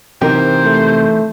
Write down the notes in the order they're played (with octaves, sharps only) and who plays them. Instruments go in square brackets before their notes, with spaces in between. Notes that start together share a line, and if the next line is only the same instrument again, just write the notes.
[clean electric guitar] C3 C4 G4 [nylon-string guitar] E3 D#4 A#4 [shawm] C5
[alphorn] A3